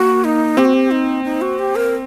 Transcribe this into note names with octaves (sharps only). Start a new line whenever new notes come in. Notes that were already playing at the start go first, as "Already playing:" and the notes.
Already playing: A#3 F#4
D#4
C4 G4
F#4
G4
D#4
D#4
F#4
G4
A#4